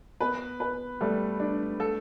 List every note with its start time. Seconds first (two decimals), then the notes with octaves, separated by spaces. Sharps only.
0.20 B3 B4
0.60 B4
1.01 G3 A3
1.40 D4
1.80 A4